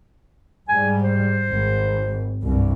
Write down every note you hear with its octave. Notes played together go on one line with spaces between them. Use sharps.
G#2 G3 G#5
C5
G#1
C2 G2